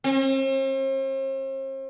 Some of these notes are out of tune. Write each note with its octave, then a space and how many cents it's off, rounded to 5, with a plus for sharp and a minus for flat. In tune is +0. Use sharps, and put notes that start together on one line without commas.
C4 +45